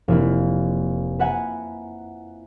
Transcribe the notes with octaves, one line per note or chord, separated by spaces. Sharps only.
F1 A#3 E4
B4 E5 F#5 G#5 A#5